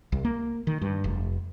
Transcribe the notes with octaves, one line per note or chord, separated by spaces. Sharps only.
C2
A#3
D#3
G2
F1